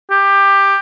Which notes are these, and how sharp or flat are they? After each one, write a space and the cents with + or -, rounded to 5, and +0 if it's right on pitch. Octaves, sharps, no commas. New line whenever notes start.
G4 +15